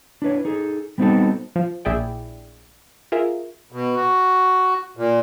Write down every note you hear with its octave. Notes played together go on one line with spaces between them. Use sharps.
D4 E4 B4 C#5
D#4 G#4 A4
G3 B3 C4 D#4 F#4 A4
F3
A#1 E4 G#4 D5 G5
F4 G#4 A#4 E5
B2
F#4
A#2